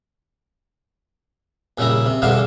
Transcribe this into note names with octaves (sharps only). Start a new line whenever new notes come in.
A#1 C#3 G3 E5 A#5
C3
E2 G2 B2 D3 E5 F5